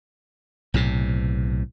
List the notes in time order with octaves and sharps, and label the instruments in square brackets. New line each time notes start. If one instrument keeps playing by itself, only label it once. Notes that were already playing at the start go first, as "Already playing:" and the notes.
[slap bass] B1 A2 C3